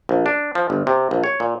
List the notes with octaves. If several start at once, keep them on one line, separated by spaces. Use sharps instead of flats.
A#1
D4
F3
G1
C3
A#1
C#5
A#2